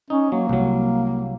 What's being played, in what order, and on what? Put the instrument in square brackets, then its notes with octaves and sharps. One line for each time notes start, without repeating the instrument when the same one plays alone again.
[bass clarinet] C#4 [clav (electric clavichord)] D#4
[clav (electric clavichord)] F#3 [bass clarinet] A#3
[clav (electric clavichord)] C2 F#3